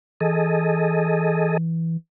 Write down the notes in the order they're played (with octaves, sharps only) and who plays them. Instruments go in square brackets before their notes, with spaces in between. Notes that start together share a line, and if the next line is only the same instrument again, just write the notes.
[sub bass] E3 [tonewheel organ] G#4 A4 D#5